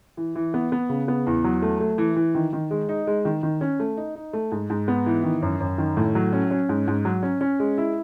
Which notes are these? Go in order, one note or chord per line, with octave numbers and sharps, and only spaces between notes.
E3
E3
B3
B3
C#3
B3
E2
F#3
A3
A3
E3
E3
D#3
D#3
G#3
D#4
G#3
D#3
D#3
C#4
A3
D#4
D#4
A3
G#2
G#2
B3
E3
D#3
F#2
F#2
D#3
A2
F#3
C#4
C#4
G#2
G#2
F#3
C#4
C#4
G#3
E4